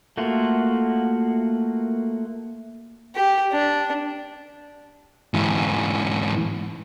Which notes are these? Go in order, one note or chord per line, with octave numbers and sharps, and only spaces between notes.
A3 A#3 F4 F#4
G4
D4
G#2 E3